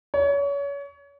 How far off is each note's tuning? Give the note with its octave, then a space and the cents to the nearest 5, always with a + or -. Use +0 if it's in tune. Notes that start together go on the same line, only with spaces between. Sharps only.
C#5 +30